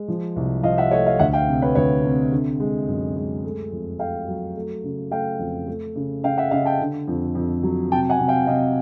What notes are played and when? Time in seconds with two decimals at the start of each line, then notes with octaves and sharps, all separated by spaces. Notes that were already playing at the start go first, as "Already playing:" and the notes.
Already playing: G#3
0.08 F3
0.36 C2
0.63 F3 D#5 F5
0.78 E5 F#5
0.91 A3 C#5 D#5
1.06 D#5 F5
1.19 D2 E5 F#5
1.33 F5 G5
1.48 C3
1.62 B4 C#5
1.75 D2 B4 C#5
2.03 C3
2.32 D3
2.60 G#3
2.88 F#2
3.16 G#3
3.44 A3
3.72 F2
3.99 A3 F5 G5
4.28 F#3
4.56 A3
4.84 C#3
5.11 A3 F5 G5
5.39 F2
5.67 A3
5.96 C#3
6.23 C#3 F5 G5
6.37 E5 F#5
6.51 C#3 D#5 F5
6.65 G5 A5
6.80 D3
7.08 F2
7.35 F2
7.63 F#3
7.92 C3 G5 A5
8.10 F#5 G#5
8.19 C3
8.28 F5 G5
8.47 C3 D#5 F5